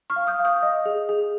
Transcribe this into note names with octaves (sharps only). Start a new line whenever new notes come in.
C#6 F6
F5
D#6 G6
F5
D#6 G6
D#5
G#4
G#4